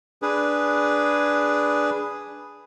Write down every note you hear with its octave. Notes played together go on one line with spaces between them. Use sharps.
D4 G#4 B4